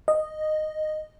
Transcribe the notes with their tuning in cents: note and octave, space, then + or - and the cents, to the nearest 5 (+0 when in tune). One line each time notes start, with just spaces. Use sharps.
D#5 -10